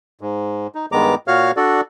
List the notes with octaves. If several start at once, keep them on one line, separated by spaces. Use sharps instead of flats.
G#2
D#4
G2 D#3 G#3 B3 A#5 D6
A#2 F#4 C#5 F5 F6
D4 F#4 A4 D5